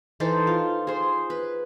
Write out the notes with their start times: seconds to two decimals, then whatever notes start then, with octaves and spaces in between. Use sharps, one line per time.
0.20 E3 D#4 A4 C5
0.47 F4
0.87 G#4 C5
1.30 B4